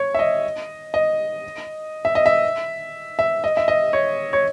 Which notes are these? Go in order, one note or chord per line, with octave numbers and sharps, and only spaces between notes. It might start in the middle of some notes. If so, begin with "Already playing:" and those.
Already playing: C#5
E5
D#5
D#5
E5
D#5
E5
E5
D#5
E5
D#5
C#5
C#5